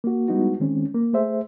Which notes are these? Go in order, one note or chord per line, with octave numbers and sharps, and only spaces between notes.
A#3 F#4
G3 G#3 B3 D#4 E4 F#4
D#3 G#3 C4 C#4
A#3
A3 G#4 C5 E5